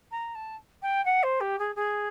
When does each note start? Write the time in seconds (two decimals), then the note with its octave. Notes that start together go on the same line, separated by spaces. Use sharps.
0.11 A#5
0.35 A5
0.82 G5
1.05 F#5
1.23 C5
1.40 G4
1.59 G#4
1.76 G#4